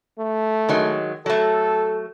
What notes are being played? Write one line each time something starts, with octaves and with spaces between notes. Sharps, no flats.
A3
D#3 F#3 G#3
F#3 A3 A4